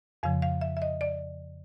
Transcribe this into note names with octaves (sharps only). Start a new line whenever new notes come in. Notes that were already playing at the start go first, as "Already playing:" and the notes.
F2 C#3 F3 F5
F5
E5
E5
D#5
D5